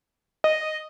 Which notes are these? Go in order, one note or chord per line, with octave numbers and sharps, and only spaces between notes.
D#5